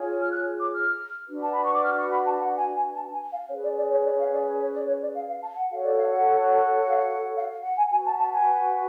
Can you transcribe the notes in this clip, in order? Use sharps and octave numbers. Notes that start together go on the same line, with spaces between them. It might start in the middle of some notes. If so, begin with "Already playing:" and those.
Already playing: F4 G#4 C#5
F6
F#6
D6
F6
D4 F#4 B4
A5
B5
C#6
D6
F6
C#6
B5
A5
F#5
G#5
G#5
A5
G#5
F5
C#4 G#4 B4 C#5
D5
D5
C#5
D5
F5
D5
C#5
C#5
D5
C#5
D5
F5
F5
A5
F#5
F#4 A4 C#5 F5
D5
F5
F#5
F#5
F5
F#5
F#5
F5
F#5
G#5
F#4 B4 G#5
A5
A5
G#5